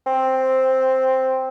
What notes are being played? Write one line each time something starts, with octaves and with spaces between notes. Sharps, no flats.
C4